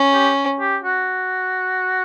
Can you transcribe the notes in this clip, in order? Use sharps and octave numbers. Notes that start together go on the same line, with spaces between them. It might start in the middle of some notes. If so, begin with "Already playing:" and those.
Already playing: C#4
G4
G4
F#4